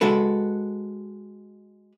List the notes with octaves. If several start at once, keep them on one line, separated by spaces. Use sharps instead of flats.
G#3 F#4 A4 B4